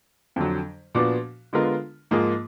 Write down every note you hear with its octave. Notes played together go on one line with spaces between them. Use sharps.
F2 D3 F#3
A#2 F3 B3 D4 F#4
D3 G#3 B3 F4 A#4
G#2 F3 A#3 F4 G#4